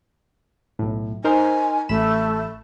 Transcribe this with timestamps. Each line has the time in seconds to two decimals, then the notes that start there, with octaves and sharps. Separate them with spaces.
0.79 B1 A2
1.24 D#4 A#4 C5 G#5
1.89 A1 A3 B5 E7